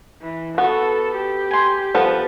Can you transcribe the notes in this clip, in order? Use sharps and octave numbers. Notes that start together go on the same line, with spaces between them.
E3
B3 F#4 A4
G4
G#5 C6
F3 B3 A4